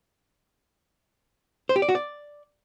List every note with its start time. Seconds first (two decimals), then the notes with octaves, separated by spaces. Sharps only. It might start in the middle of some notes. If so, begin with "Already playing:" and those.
1.69 C5
1.76 G4
1.82 D5
1.89 F#4
1.95 D5